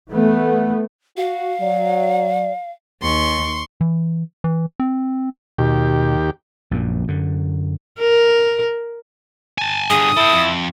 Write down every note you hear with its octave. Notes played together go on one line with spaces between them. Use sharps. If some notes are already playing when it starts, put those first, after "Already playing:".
E3 A3 B3
F#4 F5
F#3 D5
D#2 C6 C#6
E3
E3
C4
D#2 B2 G4
A#1 F#2 A#2
F#2 D3
A#4
G#5 A5
G2 D3 G#4 D#6
E4 A4 G5
F2